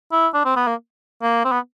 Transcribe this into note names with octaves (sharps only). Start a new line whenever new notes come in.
E4
D4
C4
B3
A#3
A#3
C4
B3